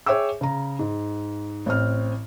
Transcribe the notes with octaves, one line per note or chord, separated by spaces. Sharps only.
G#4 C#5 E5 G5 D6 E6
C#3 A#5
G#2
A1 C4 F6